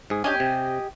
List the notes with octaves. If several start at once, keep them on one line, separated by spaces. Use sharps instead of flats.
G#2 G#4
C#4 D4 G4 D#5 G#5
C3